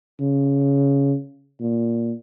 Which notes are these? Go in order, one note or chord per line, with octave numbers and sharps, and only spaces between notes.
C#3
A#2